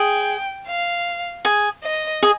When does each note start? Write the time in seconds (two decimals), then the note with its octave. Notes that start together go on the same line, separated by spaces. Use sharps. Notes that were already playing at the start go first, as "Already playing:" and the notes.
Already playing: G#4 G5
0.67 F5
1.45 G#4
1.84 D#5
2.23 G#4